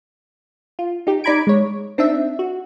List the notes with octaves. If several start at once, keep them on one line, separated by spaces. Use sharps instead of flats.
F4
D#4 G4
D#4 D5 A#5 B5 G#6 D7
G#3 C#5
C4 D4 D#4 E5
F#4